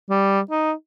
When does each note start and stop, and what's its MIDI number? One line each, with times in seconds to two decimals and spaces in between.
0.10 0.40 55
0.51 0.72 63